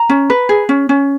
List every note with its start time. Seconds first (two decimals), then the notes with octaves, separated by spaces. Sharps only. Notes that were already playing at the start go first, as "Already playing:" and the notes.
Already playing: A#5
0.09 C#4
0.30 B4
0.49 G#4
0.69 C#4
0.89 C#4